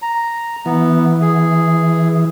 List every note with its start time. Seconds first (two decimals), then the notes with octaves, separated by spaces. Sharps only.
0.02 A#5
0.66 E3 B3
1.21 G#4